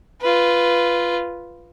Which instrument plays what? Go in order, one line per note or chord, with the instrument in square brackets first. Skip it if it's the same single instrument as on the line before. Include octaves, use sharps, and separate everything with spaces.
[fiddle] F4 B4